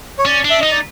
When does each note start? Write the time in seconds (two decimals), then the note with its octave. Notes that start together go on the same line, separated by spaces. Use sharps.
0.18 C#5
0.25 C#4 D5
0.45 D4
0.50 E5
0.61 D#4 D#5
0.71 D5